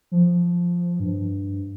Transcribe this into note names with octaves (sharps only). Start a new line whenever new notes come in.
F3
G2